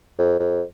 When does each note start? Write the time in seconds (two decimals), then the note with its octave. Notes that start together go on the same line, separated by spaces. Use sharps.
0.18 F2
0.39 F2